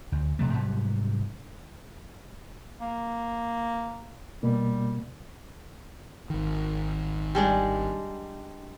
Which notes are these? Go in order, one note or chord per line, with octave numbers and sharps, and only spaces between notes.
D2
A#1 C3 F#3 A3
G#2 C3 F#3 G3
A#3
B2 G3 A#3
G#1 D#3
G3 G#3 D4